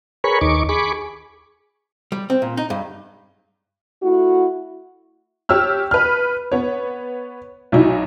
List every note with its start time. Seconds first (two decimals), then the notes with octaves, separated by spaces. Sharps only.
0.24 G#4 A#4 B4 C#5 B5 C#6
0.41 D#2 D#4 C#6 D6
0.69 G#4 B5 C#6 D6
2.12 G3
2.30 C4
2.42 A#2
2.57 D#4
2.70 G2
4.03 A3 E4 F#4
5.49 G4 C#5 E6 F6
5.91 B4 F6
6.52 B3 C#5
7.72 B1 F#3 D#4 E4